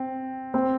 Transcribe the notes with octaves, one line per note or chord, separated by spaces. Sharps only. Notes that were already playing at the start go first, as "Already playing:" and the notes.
Already playing: C4
C4